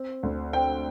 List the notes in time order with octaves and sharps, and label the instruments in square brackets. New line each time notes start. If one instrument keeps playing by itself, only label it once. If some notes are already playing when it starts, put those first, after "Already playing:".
Already playing: [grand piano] C4
D2
C4 G5